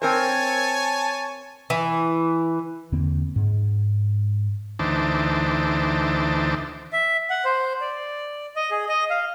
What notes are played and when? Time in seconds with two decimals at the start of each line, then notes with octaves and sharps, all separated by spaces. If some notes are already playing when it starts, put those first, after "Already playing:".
0.02 C4 A#4 C5 C#5 G#5 A5
1.70 E3
2.92 E2 D3 A#3 C4
3.36 G#2
4.79 D2 E3 D#4 C5 A5 D6
6.93 E5
7.30 F#5
7.45 C5
7.81 D5
8.56 D#5
8.71 G#4
8.89 D#5
9.10 F5